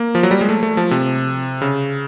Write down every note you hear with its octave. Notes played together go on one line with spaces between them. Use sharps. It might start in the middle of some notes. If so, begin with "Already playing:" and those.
Already playing: A#3
F3
F#3
G3
G#3
A3
A3
F3
C3
C#3